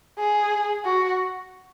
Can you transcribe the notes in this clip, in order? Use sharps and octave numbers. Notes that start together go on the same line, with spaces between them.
G#4
F#4